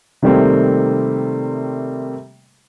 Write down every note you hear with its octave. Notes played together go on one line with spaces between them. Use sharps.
C3 D#3 G3 A3 A#3 C4